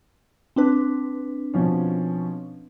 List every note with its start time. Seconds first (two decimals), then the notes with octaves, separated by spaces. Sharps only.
0.56 C4 D4 B4
1.54 B2 F3 C#4